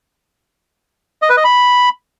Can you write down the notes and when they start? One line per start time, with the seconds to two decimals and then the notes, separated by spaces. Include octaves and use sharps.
1.22 D#5
1.30 B4
1.37 D#5
1.44 B5